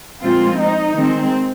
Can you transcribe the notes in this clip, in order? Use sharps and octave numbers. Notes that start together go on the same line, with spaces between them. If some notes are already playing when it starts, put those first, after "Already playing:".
A#2 F3 G#3 C4 F4
D#4
D#3 G#3 C4